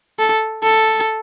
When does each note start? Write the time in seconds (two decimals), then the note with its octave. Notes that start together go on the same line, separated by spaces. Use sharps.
0.19 A4
0.64 A4